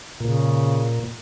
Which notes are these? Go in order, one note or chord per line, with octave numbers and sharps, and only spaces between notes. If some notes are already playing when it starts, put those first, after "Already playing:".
A#2 C#3